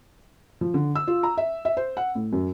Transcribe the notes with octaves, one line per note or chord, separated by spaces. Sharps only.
F3
D3
E6
F4
A#5
E5
E5
C5
F#5
A2
F#2